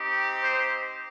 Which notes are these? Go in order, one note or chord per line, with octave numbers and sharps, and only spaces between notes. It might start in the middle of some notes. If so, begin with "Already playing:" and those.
Already playing: C4 D#4 G4
C5